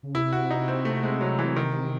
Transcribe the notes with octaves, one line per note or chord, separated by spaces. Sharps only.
C#3
C3 E4
F#4
D#4
C4
A3
G#3
F#3
E3
D#3